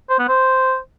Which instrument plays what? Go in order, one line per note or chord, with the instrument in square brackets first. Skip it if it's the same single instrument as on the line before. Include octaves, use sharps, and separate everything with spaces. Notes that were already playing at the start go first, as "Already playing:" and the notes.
[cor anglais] C5
B3
C5